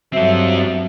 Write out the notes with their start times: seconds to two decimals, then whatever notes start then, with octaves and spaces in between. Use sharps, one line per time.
0.13 G2 F#3 C4 A4 E5